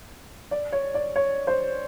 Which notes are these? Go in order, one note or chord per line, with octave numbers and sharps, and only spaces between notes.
D5
C#5
D5
C#5
C5